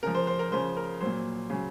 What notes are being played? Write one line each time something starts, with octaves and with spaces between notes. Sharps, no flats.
C#3 F3 A#4
C5
C5
A#4
C#3 F3 C5
A#4
A#2 F#3 C5
C#3 F#3